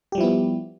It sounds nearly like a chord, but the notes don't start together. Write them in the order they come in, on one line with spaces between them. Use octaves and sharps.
G4 G3 F3 E4 B3